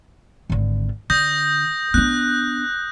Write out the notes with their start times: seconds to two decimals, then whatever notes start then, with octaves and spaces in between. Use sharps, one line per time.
0.50 G#1 D3
1.10 D3 D#6 G6 A#6
1.94 B3 D4 F#6